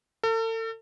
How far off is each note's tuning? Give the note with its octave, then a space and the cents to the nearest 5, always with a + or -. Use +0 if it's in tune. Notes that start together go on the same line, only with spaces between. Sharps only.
A4 +40